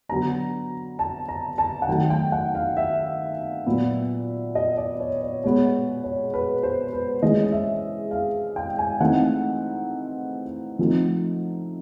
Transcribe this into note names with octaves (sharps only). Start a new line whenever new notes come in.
D3 F#3 B3 D4 A#5
A5
A#5
A5
F#5
D#3 F#3 A3 G5
G5
F#5
F5
E5
A#2 F#3 B3
D#5
D5
C#5
C#5
B2 G#3 B3 C#5
C#5
B4
C5
B4
E3 G#3 C#4 D#5
E5
F5
G5
G#5
E3 A3 C4 D#4 F#5
F3 A3 C4 D#4